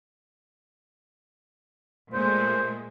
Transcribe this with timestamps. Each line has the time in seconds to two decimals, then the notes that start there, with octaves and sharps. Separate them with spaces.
2.13 A#2 G#3 A3 C5